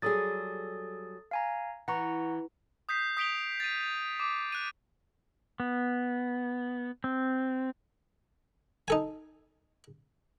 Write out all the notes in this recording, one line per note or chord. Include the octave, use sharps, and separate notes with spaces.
F#3 G3 G#4 A4 D#6 A6
F5 G#5 A#5
E3 F#5 A#5 C#6
D#6 G6 B6 C7
D#6 B6 D7 F7 G7
A6 D#7
D6
F#6 D#7
B3
C4
D#4 A4 G#5